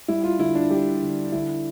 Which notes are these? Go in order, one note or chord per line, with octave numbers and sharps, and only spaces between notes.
G3 E4
F4
D3 E4
D4
G3 G4
D3
D3 E4